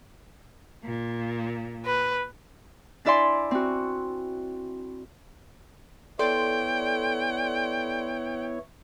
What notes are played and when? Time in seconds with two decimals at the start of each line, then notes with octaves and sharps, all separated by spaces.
0.85 A#2
1.86 B4
3.05 D4 E4 D5 E5 G#5 C6
3.51 C4 F#4
6.19 B3 E4 A4 C#5 D5 G5 C6